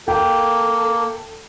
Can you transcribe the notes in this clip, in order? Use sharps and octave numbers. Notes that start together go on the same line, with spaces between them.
A#3 A4 G5